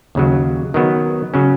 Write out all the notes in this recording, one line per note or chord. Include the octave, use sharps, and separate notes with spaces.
D#2 C#3 F#3
D#3 F#3 B3
C#3 F#3 C#4